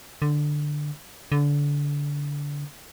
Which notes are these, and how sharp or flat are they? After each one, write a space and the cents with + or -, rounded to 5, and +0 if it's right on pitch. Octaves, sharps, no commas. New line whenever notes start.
D3 +10
D3 -25